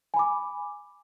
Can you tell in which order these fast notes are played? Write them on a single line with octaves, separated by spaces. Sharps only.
G#5 B5 D6